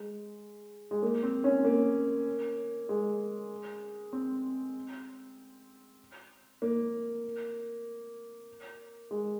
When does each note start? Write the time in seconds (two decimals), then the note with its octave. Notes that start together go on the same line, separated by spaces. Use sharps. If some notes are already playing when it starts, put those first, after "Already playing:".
Already playing: G#3
0.91 G#3
1.02 A#3
1.23 C4
1.44 C#4
1.65 A#3
2.89 G#3
4.13 C4
6.62 A#3
9.11 G#3